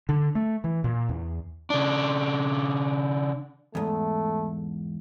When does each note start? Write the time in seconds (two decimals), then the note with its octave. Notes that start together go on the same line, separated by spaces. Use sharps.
0.09 D3
0.35 A3
0.64 E3
0.84 A#2
1.09 E2
1.70 C#3 D4
3.75 E2 G#2 A3